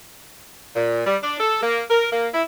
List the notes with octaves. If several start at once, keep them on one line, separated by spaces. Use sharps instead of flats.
A#2
G3
D4
A4
A#3
A#4
A#3
E4